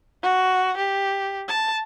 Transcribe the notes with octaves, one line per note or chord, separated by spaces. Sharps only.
F#4
G4
A5